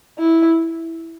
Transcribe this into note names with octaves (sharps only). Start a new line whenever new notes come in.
E4